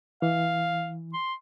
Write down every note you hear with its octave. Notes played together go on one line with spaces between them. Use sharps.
E3 F5
C6